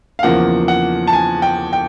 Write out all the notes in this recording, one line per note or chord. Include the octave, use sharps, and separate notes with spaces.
F5
E2 C#3 F3 A#3 F#5
F#5
A5
G#5
G5
G5